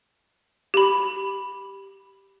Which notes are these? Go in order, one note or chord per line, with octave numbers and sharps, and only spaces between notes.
G4 B5